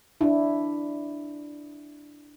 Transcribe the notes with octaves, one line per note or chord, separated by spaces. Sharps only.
D4 E4